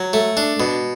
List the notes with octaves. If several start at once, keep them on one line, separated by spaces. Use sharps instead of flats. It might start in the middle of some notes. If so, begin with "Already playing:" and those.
Already playing: F#3
A3
D4
B2